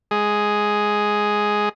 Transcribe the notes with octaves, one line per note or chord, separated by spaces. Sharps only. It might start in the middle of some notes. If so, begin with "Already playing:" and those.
G#3 G#4